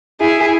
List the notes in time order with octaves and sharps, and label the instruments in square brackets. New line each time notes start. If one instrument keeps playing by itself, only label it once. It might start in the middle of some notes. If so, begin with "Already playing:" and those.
[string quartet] E4 G#4